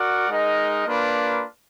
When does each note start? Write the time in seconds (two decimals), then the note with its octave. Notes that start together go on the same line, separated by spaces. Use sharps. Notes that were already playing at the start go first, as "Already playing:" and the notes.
Already playing: F#4 A#4 D5 F#5
0.29 G#3 D#4 A#4 D#5 F#5
0.86 A#3 D4 F4 B4